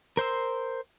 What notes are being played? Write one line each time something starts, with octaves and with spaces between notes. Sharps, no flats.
A#4 C5 C6 E6